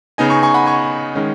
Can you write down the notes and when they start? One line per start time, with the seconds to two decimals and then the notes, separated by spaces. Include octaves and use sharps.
0.18 C#3 B3 D#4 D#5 G#5
0.30 G#5 C#6
0.43 G#5 C#6
0.54 F#5 B5
0.67 G#5 C#6
1.15 D#3 G#3 C#4